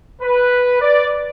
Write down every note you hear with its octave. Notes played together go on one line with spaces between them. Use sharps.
B4
D5